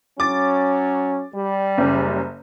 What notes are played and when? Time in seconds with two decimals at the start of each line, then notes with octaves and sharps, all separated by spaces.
0.20 F#3 C#4 D6 A6
1.34 G3
1.78 F#1 F#2